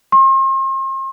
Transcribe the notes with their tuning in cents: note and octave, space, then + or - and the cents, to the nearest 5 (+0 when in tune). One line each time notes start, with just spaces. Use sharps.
C6 +40